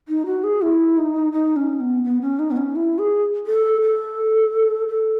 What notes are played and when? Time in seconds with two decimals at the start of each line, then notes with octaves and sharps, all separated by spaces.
0.08 D#4
0.26 F#4
0.44 G#4
0.62 E4
0.97 D#4
1.32 D#4
1.56 C#4
1.80 B3
2.04 B3
2.21 C#4
2.39 D#4
2.51 B3
2.57 C#4
2.75 E4
2.98 G#4
3.46 A4
3.82 A4
4.88 A4